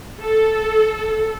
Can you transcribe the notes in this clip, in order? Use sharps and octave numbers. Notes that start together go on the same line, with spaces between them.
A4